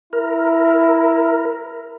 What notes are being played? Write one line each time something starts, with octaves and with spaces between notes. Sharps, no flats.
E4 A#4